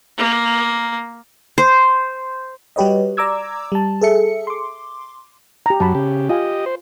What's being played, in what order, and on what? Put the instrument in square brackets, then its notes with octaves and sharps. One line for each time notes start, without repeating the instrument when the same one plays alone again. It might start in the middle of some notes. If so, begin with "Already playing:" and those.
[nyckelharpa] A#3
[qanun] C5
[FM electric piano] G3 F#4 G4 B4 C#5 D#5
D5 A#5 D6 E6 G#6
G3 A5
G#4 A4 E5 C#7
C6 D6
[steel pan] G4 A#5
[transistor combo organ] F#2 F#3 [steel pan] A5 B5
[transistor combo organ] C#3 G4
[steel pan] F4 F5 G#5 [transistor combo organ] G4 D#5
[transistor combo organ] C5